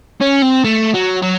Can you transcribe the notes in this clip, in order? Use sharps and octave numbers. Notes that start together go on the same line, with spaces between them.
C#4
C4
A3
F#3
F#3